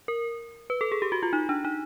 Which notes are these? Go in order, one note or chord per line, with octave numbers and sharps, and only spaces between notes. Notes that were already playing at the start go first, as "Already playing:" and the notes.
A#4
B4
A4
G#4
G4
F#4
F4
D#4
D4
D#4